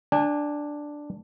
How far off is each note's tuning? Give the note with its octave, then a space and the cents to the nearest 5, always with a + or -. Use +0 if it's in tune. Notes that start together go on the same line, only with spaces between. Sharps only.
D4 +0 G#5 -30